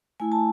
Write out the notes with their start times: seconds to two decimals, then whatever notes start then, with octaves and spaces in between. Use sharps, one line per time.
0.20 A3 E4 G#5
0.32 A5